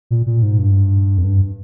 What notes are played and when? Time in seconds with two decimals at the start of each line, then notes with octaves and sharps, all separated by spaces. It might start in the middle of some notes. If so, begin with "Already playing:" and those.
0.11 A#2
0.26 A#2
0.42 G#2
0.59 G2
1.18 F2
1.24 G2